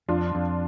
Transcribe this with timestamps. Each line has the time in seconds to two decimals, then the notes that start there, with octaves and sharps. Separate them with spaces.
0.09 F2 D4 F4
0.35 F2